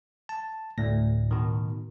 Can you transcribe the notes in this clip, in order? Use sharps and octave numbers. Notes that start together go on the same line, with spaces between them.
A5
D2 A2 A#6
B2 D#3